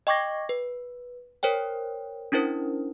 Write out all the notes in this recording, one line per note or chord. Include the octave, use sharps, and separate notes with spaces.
D#5 G5 C#6 D6 G#6 A#6
B4
A#4 C5 C#5 G5
C#4 D4 E4 A#4 C5